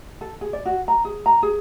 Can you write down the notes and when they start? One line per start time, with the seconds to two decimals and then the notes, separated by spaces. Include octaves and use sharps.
0.21 A4
0.41 G#4
0.53 D5
0.66 F#4
0.88 A#5
1.05 G#4
1.26 A#5
1.43 G#4